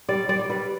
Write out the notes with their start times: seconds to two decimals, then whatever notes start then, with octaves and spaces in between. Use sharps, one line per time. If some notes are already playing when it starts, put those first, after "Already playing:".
0.09 G3 D5
0.29 G3 D5
0.39 D5
0.50 G3 B4